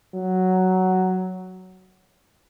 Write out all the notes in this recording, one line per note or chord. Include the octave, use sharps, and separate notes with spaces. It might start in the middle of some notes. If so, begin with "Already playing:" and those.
F#3